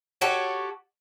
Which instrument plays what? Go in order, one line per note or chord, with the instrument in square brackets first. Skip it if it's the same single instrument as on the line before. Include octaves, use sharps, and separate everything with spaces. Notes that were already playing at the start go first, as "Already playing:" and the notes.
[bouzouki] F#4 G4 A4 C#5